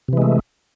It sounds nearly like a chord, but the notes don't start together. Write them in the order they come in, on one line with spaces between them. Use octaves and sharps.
C3 E3 G#3 A3